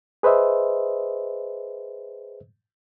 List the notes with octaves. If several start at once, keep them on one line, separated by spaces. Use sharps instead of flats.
G#4 B4 C5 D#5 E5